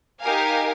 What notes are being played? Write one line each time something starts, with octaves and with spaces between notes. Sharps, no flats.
D#4 G4 A#4 F5 G#5